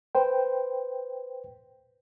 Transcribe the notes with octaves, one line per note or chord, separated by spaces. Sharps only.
B4 C5 G5